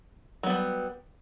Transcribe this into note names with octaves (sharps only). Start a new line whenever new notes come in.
F#3 G3 B3